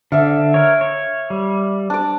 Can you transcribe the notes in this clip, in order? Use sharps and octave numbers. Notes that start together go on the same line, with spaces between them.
D3 E5 F5
A#4 C#5
C#5
G3
D4 D5